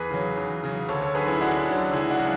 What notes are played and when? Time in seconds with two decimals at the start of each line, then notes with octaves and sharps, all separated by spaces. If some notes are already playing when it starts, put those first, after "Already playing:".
Already playing: E2 G#4 B4
0.11 C#3 F#3
0.37 E2
0.64 C#3 F#3
0.88 D2 A4 C#5
1.02 A4 C#5
1.15 D3 F#3 G#4 B4
1.28 C#4 E4
1.41 D2 D4 F#4
1.68 D3 F#3
1.93 C#2 E4 G#4
2.10 D4 F#4
2.19 C#3 F#3